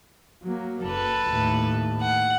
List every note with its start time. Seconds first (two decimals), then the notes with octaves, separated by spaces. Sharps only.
0.43 F#3 A#3
0.84 F#1 A4 B4
1.28 D#2 A2
2.02 F#5